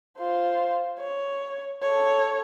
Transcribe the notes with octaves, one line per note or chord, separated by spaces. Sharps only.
F4 C5
C#5
A4 C#5